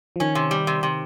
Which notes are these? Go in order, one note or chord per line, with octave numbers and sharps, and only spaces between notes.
F3
D#3 C#4
C3
G3
C3
C3